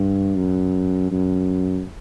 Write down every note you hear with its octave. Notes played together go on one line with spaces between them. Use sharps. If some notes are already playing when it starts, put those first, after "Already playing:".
Already playing: G2
F#2
F#2